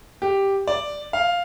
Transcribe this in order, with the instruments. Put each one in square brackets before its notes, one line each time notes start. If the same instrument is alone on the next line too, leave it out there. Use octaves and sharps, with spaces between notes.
[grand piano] G4
D5
F5